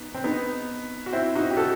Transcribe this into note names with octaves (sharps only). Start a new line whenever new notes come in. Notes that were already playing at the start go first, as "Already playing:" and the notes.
Already playing: B3 D#4
C4
B3 D#4
F#4
C4 E4
D#4 F#4
G4
F#4 A4